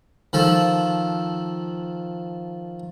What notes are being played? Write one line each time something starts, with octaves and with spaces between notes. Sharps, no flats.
D#3 F3 A4